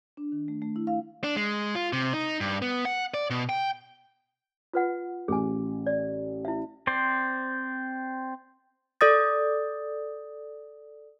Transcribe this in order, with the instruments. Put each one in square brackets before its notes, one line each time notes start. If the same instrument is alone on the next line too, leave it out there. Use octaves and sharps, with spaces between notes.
[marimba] D4
D#3
A3
A3
E4
F5
[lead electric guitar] D4
G#3
F4
C3
D#4
G2
B3
F#5
D5
B2
G5
[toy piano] F4 B4 F#5
[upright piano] A1 [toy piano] G#4 G#5
[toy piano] D5
E4 E5
[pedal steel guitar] C4 C5 D5
[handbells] A4 D5 D#6 A6